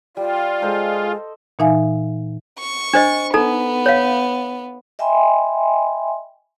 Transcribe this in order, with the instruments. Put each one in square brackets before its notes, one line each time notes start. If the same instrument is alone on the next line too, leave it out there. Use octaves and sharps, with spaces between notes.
[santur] G3 [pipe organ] F4 [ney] D5
[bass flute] G#3 [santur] A4 C5 D#5
[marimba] A#2 E3 D#4 E5 F5 G#5
[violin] C#6
[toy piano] D4 C5 D#5
[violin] B3 [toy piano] D#4 A4 A#5
[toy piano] C#5 F5
[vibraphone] D#5 E5 G5 G#5 B5 C6